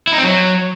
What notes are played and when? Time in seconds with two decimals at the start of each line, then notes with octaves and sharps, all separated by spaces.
0.07 E4
0.13 D#4
0.18 C4
0.23 F#3